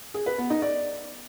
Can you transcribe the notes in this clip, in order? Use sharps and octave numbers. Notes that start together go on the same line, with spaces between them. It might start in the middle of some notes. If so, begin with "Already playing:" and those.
G#4
B4
B3
D#4
D5